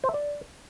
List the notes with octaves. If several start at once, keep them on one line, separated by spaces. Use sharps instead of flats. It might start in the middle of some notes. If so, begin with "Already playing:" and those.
C5
E5
D5